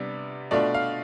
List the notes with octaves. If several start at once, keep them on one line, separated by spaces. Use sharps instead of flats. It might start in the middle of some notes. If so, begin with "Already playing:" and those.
Already playing: C3 G3 B3 D4
B2 A3 D4 F4 D5
F5